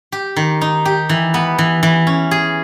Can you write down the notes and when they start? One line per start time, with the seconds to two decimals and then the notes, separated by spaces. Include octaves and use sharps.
0.12 G4
0.36 D#3
0.61 D#4
0.85 G4
1.09 E3
1.34 B3
1.58 E3
1.83 E3
2.07 C#4
2.31 G#4